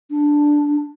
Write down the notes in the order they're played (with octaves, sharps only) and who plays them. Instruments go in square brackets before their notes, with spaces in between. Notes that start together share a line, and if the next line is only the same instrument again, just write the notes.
[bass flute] D4